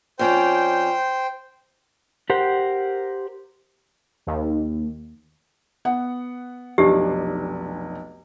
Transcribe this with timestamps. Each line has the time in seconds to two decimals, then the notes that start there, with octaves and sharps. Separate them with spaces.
0.19 F2 C#4 C5 D5 G5
2.30 G4 A#4 C5 F#5
4.27 D#2
5.85 B3 F#5
6.78 F1 B1 D4 G4